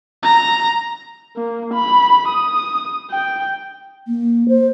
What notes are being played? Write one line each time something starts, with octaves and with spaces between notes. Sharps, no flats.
A#5
A#3
B5
D#6
G5
A#3
C5